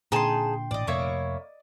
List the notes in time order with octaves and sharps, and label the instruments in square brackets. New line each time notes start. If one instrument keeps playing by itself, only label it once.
[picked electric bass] A#2 D3 [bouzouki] D#4 G#4 A5 [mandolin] G5 C6
[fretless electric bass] A1 A2 [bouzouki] D5 D#5
[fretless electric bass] F2 C3 A3 [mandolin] A#3 E4 C#5